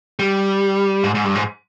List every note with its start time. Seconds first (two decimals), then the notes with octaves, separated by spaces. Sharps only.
0.19 G3
1.04 G#2
1.15 G#2
1.25 G2
1.35 G#2